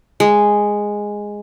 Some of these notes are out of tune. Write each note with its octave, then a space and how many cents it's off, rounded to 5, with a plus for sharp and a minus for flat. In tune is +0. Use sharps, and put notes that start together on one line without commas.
G#3 -5